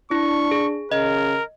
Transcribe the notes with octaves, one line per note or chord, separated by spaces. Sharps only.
D4 E4 C#6
G#4
C#3 A#4 D#5